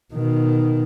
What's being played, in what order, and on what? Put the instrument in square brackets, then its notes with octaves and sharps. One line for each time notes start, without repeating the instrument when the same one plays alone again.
[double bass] B2 D#3